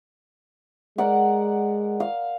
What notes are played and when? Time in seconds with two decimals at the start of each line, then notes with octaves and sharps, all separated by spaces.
0.98 G#3 A#4 D5 F#5
2.00 F5